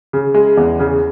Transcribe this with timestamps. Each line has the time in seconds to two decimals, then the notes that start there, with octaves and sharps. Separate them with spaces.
0.13 C#3
0.34 G#3
0.57 E2
0.80 C#3